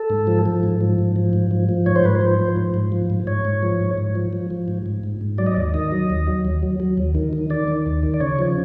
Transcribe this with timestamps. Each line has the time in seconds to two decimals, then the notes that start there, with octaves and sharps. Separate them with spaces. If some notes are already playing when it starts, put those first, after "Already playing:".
Already playing: A4
0.10 G#2
0.27 F3
0.46 F3
0.63 G#2
0.81 F3
0.98 G#2
1.16 F3
1.33 G#2
1.51 F3
1.69 F3
1.86 G#2 C#5
1.96 C5
2.04 G#2 B4
2.15 C5
2.21 F3
2.39 F3
2.56 G#2
2.74 G#2
2.92 F3
3.10 G#2
3.27 G#2 C#5
3.45 G#2
3.63 F3
3.80 G#2
3.98 G#2
4.15 F3
4.33 F3
4.50 F3
4.68 G#2
4.86 G#2
5.03 G#2
5.21 G#2
5.38 F#3 D5
5.46 D#5
5.55 D#2 D5
5.74 D#3 D#5
5.92 F#3
6.10 D#2
6.27 F#3
6.45 D#2
6.63 F#3
6.80 F#3
6.97 D#2
7.15 D#3
7.33 D#3
7.50 D#3 D5
7.68 D#3
7.86 D#2
8.03 D#3
8.14 D5
8.20 C#3 C#5
8.39 F3